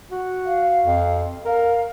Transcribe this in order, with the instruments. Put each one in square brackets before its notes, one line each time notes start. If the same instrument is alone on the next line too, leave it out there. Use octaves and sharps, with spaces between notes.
[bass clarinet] F#4
[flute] F5
[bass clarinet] F2
[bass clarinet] A#4 [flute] F5